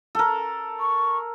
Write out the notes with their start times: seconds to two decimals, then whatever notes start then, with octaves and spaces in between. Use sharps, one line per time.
0.15 A4 A#4
0.80 C#6